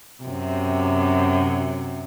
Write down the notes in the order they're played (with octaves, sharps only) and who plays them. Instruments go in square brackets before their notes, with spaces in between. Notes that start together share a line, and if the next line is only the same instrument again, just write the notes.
[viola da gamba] F#2 C3